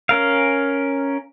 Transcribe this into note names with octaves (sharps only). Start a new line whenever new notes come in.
C#4 A#4 F5